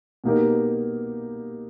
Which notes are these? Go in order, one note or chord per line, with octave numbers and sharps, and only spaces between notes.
B2 A#3 D#4 G4 A#4